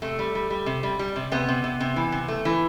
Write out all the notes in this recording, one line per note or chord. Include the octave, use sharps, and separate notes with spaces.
C3 A3
G3
G3
G3
C3
G3
G3
C3
C3 B3
C3
C3
C3
E3
C3
A3
E3